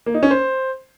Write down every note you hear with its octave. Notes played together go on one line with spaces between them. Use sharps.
A#3
D#4
C#4
C5